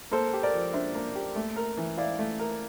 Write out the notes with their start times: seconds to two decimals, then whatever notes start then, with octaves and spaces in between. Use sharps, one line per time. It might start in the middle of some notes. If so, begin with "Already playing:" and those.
0.11 A#3 A4 C5
0.33 G4
0.43 A#4 D5
0.54 F3
0.73 D4 C5 E5
0.95 A#3
1.15 G4
1.36 A3
1.56 A#4
1.77 E3
1.97 E4 D5 F5
2.19 A3
2.39 A#4